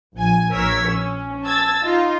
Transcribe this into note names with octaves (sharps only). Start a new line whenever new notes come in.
A#1 G#5
A#1 A#4 C#5 E6 G#6 B6
C#4
A5 E6 G#6 A6
D#4 F4